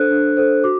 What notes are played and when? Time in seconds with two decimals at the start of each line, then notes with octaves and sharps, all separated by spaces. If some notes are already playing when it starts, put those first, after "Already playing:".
Already playing: D4 A4 C5 F#6
0.10 D4
0.37 A4 C5
0.64 F#4 D6